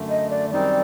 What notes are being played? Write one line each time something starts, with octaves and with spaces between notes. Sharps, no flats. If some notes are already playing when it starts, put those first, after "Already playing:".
Already playing: F#2 D3 A3
D#5
D5
F#2 D#3 G3 C4 D#4 D5